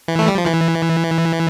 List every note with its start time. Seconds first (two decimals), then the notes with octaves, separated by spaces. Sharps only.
0.08 E3
0.19 A3
0.28 G3
0.38 F3
0.46 E3